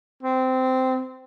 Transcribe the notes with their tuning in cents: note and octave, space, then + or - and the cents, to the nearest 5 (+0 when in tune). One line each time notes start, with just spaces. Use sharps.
C4 -15